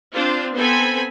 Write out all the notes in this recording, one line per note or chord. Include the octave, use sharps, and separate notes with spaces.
C4 D4 F4 C5
B3 C4 A4 C5 G#5 B5